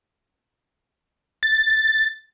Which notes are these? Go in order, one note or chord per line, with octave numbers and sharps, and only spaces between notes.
A6